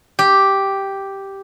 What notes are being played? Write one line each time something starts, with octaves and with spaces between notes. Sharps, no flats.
G4